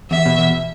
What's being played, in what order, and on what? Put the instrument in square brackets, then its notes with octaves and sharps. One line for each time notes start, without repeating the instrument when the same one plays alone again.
[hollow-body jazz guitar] E2 [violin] E5
[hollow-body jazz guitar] B2
E2